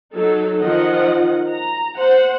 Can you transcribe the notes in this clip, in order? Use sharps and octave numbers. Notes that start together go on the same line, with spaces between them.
F#3 D#4 A4
D#3 F3 D#5 F#5
A#5
C5 F#5